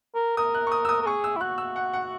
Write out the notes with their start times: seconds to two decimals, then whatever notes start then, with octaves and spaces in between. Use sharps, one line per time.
0.15 A#4
0.37 A#4 D#6
0.54 F#6
0.67 C#6
0.72 D#6
0.85 E6
0.89 D#6
1.02 A#4
1.06 G#4 C#6
1.24 E6
1.36 E4
1.41 F#4 F#6
1.58 E6
1.76 F#5
1.93 F#5